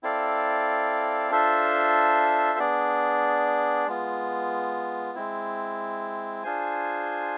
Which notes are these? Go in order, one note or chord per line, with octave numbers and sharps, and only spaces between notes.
C4 E4 A4 D5 F5
D4 F4 A4 C5 E5
B3 D4 G#4 D5
G#3 B3 F4
G#3 C4 E4
D4 F4 G#4 C5 G#5